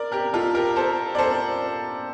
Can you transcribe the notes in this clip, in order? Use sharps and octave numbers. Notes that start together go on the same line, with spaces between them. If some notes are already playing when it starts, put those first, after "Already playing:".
Already playing: A#4 D5
G4 A#4
F4 A4
G4 A#4
A4 C5
D5
A4 C5